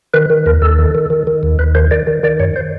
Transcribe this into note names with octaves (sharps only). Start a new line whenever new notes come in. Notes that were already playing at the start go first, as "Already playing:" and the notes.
D#3 B4
D#3
D#2 A#4
D#2 A4
D#3
D#3
D#3
D#3
D#2
D#2 B4
D#3 C5
D#3 D5
D#3
D#3 D5
F#2 C#5
C5